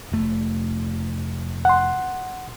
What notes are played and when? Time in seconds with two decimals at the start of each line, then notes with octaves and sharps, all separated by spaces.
0.12 F1 A3
1.65 F#5 C6